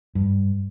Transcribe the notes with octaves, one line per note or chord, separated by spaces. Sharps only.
G2